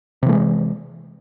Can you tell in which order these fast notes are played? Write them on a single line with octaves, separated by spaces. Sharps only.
C3 E3 A3 G#3